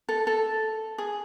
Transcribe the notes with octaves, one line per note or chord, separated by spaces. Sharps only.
A4
A4
G#4